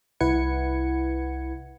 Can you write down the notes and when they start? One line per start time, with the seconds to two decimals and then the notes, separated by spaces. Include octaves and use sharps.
0.20 C2 E4 B4 F#5 G#6 C#7